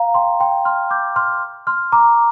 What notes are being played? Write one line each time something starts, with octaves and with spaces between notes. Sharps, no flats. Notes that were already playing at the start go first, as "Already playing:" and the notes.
Already playing: F5 A#5
G5 C6
G5 C6
C6 F6
D6 G6
C6 F6
C6 F6
A#5 D6